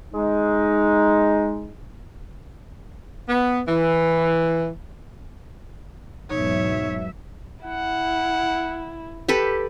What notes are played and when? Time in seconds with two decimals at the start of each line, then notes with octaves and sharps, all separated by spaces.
0.12 G#3 D#4
3.28 B3
3.67 E3
6.30 E2 G#2 B2 F#3 D#4 C#5 E5
7.65 E4 F#5
9.28 G4 A4 B4